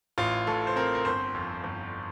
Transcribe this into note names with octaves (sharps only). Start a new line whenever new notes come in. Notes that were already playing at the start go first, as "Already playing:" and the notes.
A1 F4
A2 A4
C5
C4 A#4
A#4
G1 C5
F2
G1